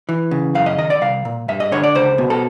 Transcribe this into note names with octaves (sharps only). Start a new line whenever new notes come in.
E3
C#3
F#2 F5
D#5
D#3 D#5
D5
C2 F5
A#2
G2 E5
D#5
D3 C#5
D5
C#2 C5
B2
A4